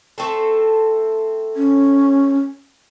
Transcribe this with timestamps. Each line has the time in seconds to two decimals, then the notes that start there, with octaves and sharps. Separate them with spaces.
0.18 A3 C4 A4
1.56 C#4